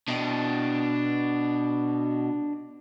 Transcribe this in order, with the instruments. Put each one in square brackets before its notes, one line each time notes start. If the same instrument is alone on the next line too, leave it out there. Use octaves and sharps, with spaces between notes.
[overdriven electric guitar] B2 [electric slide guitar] D4 D#5 G5